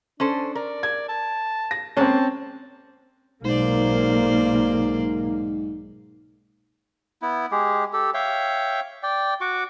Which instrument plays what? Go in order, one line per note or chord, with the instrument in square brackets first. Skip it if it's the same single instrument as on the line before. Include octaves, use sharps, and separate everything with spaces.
[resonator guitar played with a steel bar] C#4 A4 C5 [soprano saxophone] D4
[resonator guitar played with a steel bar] A#4 [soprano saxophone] D5
[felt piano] G#6
[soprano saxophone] A5
[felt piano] A#6
[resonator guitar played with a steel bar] G#3 A#3 G#4 [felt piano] C4 C#4 [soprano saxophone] A5
[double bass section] B1 A#3 [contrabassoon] G#2 [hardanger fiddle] C5 D5
[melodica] B3 E4
G#3 G4 G#4
G4 A4
C#5 E5 F5 G5
D5 G5
F#4 C#6 D6